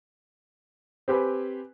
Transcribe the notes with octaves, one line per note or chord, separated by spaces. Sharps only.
C4 G4 B4 G#5